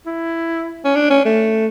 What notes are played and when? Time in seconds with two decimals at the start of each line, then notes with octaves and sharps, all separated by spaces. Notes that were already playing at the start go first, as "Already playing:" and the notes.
0.06 E4
0.85 C#4
0.96 D4
1.10 C#4
1.25 A3